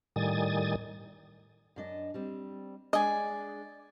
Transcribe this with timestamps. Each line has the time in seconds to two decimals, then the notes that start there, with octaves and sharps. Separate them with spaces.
0.16 A2 D#3 G3 G#5 D#6 A6
1.76 F#2 D4 D#5
2.14 G3 C4
2.93 G#3 D4 D5 D#5 G#5